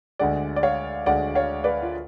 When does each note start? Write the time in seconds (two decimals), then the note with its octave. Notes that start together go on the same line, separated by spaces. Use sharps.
0.19 D2 D3 G#3 D5 F#5
0.56 D5
0.63 C#5 F5
1.06 D2 D3 G#3 D5 F#5
1.35 C#5 F5
1.64 B4 D5
1.82 F4